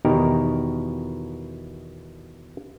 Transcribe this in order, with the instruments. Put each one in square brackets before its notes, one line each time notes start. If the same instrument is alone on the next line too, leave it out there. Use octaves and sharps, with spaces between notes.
[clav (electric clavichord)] E2 B2 D#3 D#4 G4 A#4